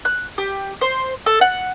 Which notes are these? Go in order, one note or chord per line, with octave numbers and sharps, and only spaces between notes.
F#6
G4
C5
A4
F#5